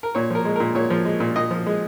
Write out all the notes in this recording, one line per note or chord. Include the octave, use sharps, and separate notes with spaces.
A#4
A#2 C#5
F3 A#4
G#3
A#2 A#4
A#2 C#5
F3
G#3
A#2
A#2 D#5
F3
G#3